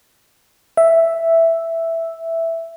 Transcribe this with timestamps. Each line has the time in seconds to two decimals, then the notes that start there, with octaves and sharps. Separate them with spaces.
0.77 E5